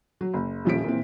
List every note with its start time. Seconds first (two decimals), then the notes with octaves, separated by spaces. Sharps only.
0.21 F#3
0.34 F#1
0.65 D#1 A#1 F3 C#4 B6 D7
0.84 A#2 E3 C4